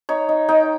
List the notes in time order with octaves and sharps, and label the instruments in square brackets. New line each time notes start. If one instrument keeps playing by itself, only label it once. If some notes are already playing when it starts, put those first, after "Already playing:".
[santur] D#4 C#5
D#4
D#4 G5